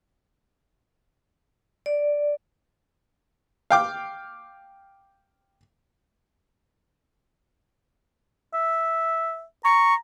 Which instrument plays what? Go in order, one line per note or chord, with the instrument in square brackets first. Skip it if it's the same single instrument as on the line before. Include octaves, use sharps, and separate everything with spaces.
[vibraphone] D5
[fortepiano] F5 G5 D6
[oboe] E5
[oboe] A#5 [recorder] C#6